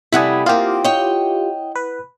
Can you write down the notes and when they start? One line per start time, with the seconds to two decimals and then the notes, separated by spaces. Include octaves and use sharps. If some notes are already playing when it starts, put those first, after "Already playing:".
0.12 C3 G3 A3 E4 F#5 G#5 B5 D#6
0.46 A#3 C4 F4 G4
0.84 C#5 D#5 G5
1.75 B4